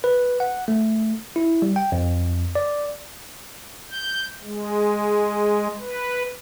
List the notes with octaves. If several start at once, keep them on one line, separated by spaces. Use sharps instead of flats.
B4
F#5
A3
E4
G3
G5
F2
D5
G6
G#3
B4